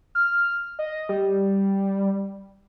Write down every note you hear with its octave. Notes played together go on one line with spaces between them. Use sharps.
F6
D#5
G3